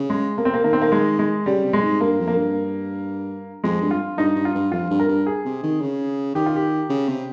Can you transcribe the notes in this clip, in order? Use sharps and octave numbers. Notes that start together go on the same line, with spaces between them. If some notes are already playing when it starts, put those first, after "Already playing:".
Already playing: C#3
G#3
C3 A#3
C4
A#3
D#3 A#3
C4
A#3
G#3
G#3
C#3 G3
C3
G#3
G#2
G2 A#3
F2
A#3
G2
F2 G#3
G2
F4
G2 D#4
G2
F4
G2
F2 F4
G2
A#4
G2
G#4
C3
D#3
C#3
D#3 G4
F4
G4
C#3
C3